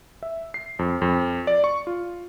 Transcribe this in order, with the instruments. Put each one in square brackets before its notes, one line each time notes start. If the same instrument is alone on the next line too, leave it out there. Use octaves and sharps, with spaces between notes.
[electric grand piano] E5
C7
F2
F2
D5
C#6
F4